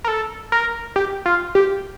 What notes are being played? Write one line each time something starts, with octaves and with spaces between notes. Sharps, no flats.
A#4
A4
A#4
G4
F4
G4